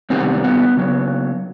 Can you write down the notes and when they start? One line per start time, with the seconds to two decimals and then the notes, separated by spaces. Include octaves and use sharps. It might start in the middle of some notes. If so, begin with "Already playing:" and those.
0.10 C3 D#3 G3 B3 C4
0.44 B3
0.77 C#3 F#3 B3